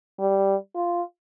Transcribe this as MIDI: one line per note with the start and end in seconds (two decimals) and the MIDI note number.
0.19 0.55 55
0.75 1.02 65